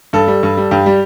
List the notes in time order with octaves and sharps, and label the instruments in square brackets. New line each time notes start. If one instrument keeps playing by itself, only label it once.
[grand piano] G2 A4
G3
G2
G3
G2 G4
G3